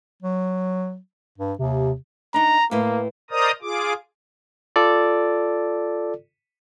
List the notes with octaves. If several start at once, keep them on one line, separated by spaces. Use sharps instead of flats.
F#3
G2
D#2 C3
D4 D#4 A#5
A2 A#3 B4
A#4 C5 D5 D#5 A#5 D#6
F4 G#4 D6
F4 A4 D5